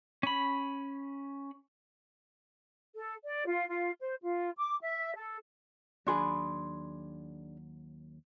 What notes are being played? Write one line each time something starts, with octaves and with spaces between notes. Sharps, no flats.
C#4 B5
A4
D5
F4
F4
C5
F4
D6
E5
A4
D#2 F#3 D4 G#4 B5 C6